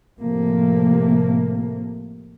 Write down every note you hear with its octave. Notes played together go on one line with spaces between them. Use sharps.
A2 C3 F3 A3 A#3